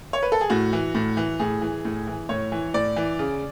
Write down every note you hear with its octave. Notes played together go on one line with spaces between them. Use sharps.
C#5
B4
A4
G#4
A2 F#4
E3
A2
E3
A2 G#4
E3
A2
E3
A2 C#5
E3
A2 D5
E3
C#3